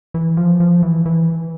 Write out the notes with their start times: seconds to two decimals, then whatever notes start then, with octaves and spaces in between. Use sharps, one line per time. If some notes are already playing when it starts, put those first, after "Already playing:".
0.14 E3
0.37 F3
0.60 F3
0.83 E3
1.06 E3